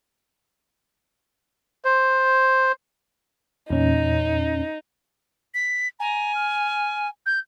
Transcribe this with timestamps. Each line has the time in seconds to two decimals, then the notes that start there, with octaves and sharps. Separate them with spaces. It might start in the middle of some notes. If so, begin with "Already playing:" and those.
1.85 C5
3.70 E2 A#2 C#4 D#4
5.54 B6
5.99 G#5 A#5
6.35 F6
7.26 G6